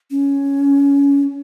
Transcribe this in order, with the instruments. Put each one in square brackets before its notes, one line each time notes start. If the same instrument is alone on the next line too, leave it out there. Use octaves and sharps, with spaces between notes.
[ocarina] C#4